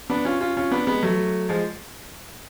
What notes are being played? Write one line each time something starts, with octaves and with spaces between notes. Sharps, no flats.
B3 D4
C#4 F4
C#4 F4
C#4 F4
B3 D4
G#3 B3
F#3 A3
F3 G#3